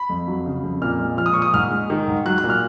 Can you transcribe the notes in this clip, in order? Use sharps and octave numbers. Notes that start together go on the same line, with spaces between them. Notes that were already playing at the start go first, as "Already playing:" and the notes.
Already playing: B5
F2
F#3
C#3
F2
A#2 F6
G#3
F3 F6
D#6
A#2 C#6
D#6
G#2 F6
G#3
D#3
G#2
F#3 F#6
F#6
A#2
F6